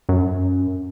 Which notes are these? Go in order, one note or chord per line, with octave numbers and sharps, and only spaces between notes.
F#2